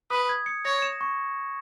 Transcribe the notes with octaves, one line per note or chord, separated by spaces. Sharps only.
B4 D#6
G#6
C#7
C#5 A#6
E7
C#6